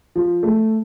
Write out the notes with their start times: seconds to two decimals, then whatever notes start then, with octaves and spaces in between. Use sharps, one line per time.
0.16 F3
0.43 A3